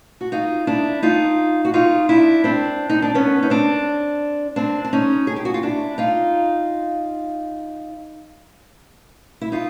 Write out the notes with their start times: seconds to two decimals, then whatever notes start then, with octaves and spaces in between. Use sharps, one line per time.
0.21 F#4
0.32 D#4 F4
0.67 D4 E4
1.03 D#4 F4
1.65 F#4
1.74 D#4 F4
2.09 D4 E4
2.44 C4 D4
2.90 D#4
3.02 D4
3.15 B3 C#4
3.42 D#4
3.50 C4 D4
4.56 C4 D4
4.84 D4
4.93 C#4 D#4
5.27 G#4
5.36 G4
5.45 F#4
5.54 F4
5.62 D4 E4
5.98 D#4 F4
9.41 E4
9.52 D#4 F4